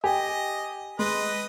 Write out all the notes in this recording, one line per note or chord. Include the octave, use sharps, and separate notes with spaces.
G4 D#5 G#5
G#3 B4 D#5